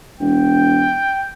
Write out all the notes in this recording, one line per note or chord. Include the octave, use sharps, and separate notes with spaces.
E1 G5